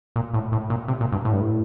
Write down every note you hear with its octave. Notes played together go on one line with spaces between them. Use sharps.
A#2
A2
A2
A#2
C3
A#2
G2
A2
G2
A2